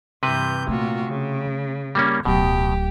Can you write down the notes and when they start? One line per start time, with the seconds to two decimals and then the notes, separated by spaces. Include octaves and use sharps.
0.23 G2 C3 E3 B4 G6
0.68 A#2 A3 F4 F#4
1.06 C#3
1.95 G3 A#3 C#4
2.25 D1 B2 F#3 G4